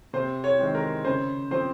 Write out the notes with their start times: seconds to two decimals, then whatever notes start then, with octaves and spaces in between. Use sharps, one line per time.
0.13 C3 C5
0.44 C#5
0.59 D#3 G#3 C4
0.75 A#4
1.05 C#3 C5
1.51 F3 C4 C5